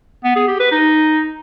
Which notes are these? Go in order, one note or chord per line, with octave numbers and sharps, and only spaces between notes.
B3
G#4
G4
B4
D#4